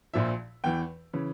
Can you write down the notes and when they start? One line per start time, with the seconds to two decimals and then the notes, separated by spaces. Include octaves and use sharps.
0.14 A#1 A#2 F3 E5
0.64 E2 E3 G5
1.13 C#3 E3